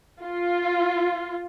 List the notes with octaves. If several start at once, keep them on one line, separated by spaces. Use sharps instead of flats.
F4